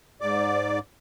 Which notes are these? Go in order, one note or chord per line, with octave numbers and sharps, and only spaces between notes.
G#2 D5 D6